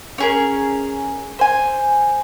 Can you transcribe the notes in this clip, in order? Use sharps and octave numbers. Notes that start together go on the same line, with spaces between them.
C#4 G#4 A#4
C5 G#5